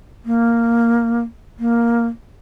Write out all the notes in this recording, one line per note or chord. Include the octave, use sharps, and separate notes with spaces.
A#3
A#3